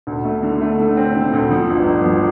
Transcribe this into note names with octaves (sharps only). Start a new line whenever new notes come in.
D2
A3
D3
A3
D3
C4
D3
D2
F3
G1
G1
F3